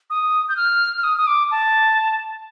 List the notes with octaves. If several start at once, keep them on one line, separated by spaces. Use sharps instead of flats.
D#6
G6
F6
F6
D#6
D#6
D6
A5